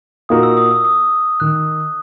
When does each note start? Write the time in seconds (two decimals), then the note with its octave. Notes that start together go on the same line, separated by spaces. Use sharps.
0.29 A#2 A#3 D#4 F#4 A#4 D#6
0.43 E6
0.57 D#6
0.71 E6
0.85 D#6
1.40 D#3 F#6